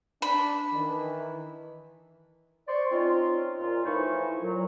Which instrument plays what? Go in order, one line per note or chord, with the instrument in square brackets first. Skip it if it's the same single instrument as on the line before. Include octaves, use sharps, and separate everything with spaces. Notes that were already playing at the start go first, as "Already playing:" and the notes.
[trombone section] D4 [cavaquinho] B5
[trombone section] D#3 E3
[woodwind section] C5 D5 C#6
C4 C#4 D#4 F4
A#2 F4
A2 E3 F3 D#4 E4 C#6
A#2 F#3